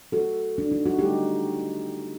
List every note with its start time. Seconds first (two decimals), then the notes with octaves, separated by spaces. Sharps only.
0.12 F#4 A4
0.58 D4
0.72 D#4
0.86 F#4
0.98 D3 A3 D#4 G4